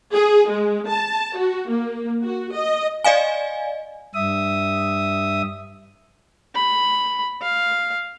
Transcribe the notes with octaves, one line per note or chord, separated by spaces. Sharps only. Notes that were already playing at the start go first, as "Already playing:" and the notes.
G#4
G#3
A5
F#4
A#3
F#4
D#5
D5 D#5 F5 G#5
G2 E5 D#6
B5
F5